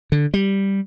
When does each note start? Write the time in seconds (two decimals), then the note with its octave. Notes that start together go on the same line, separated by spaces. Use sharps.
0.12 D3
0.34 G3